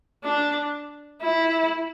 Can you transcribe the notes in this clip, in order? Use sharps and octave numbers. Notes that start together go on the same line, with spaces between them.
D4
E4